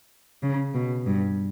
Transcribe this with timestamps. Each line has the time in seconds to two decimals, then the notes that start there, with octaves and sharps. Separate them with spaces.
0.43 C#3
0.74 B2
1.07 G2